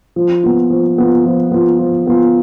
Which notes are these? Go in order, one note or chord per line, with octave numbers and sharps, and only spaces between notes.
F3
B3 F4
F3
B3 F4
F3
B3 F4
F3
B3 F4